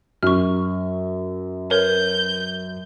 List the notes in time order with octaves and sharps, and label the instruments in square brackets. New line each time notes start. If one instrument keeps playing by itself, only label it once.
[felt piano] F#2 [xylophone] C#6 F6
[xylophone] A#4 B4 C#5 [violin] G6